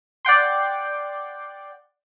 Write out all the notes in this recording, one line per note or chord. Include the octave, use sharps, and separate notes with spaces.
D5 F#5 G5 C6